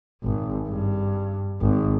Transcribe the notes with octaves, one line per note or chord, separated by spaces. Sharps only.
G#1
G2
G#1